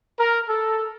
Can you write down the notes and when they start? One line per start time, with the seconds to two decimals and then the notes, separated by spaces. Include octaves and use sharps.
0.19 A#4
0.49 A4